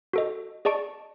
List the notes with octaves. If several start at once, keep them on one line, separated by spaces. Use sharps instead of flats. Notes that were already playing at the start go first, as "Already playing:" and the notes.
F#4 A4 D#5
G#4 D5 D#5 A5 C#6 D7